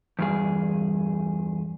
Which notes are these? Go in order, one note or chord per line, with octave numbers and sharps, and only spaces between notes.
E2 G2 G#4